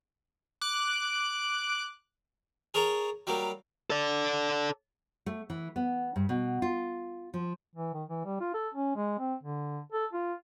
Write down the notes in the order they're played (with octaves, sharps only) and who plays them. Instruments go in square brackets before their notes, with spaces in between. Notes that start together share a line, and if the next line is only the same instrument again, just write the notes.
[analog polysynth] D6 F#6
[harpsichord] G#4 A#4 C#5 A5 A#5
F#3 G3 A#3
[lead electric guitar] A4 D5
[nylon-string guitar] A3
E3
B3
G2
B2
F4
F3
[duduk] E3
D#3
E3
G3
F4
A4
C#4
G#3
C4
D3
A4
F4